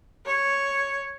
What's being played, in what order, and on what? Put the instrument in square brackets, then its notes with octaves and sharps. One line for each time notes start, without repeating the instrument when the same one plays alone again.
[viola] C#5